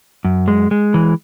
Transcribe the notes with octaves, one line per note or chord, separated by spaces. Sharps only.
F#2
G#3
G#3
E3